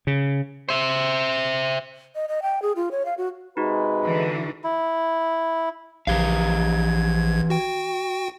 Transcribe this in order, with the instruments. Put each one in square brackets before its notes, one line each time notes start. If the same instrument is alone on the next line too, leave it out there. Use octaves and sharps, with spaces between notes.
[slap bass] C#3
[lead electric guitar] C5 E5
[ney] D#5
D#5
G5
G#4
F4
C#5
F5
F#4
[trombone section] C3 G#3 [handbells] D#4 F#4 [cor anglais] B4
[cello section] D3 E3
[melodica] E4
[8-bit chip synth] A#1 G#6 [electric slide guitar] E3 G4 F5
[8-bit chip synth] F#4 G5